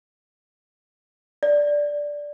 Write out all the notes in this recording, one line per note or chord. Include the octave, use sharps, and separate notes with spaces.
D5